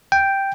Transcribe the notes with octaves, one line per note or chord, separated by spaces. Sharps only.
G5